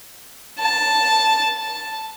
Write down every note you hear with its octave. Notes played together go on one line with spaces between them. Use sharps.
A5
A5